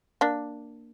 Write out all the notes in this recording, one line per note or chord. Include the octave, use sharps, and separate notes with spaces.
A#3 D4